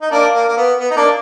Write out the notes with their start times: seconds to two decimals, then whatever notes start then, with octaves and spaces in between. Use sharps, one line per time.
0.01 D#4
0.11 A#3 D4
0.34 A#3
0.48 A#3
0.57 B3
0.80 B3
0.91 D#4
0.96 A#3 D4